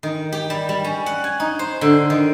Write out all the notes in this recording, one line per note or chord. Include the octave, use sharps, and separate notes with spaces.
D#3
G4
G3
G3
C#4
F#5
G#5
D#4
C5
D3
D#3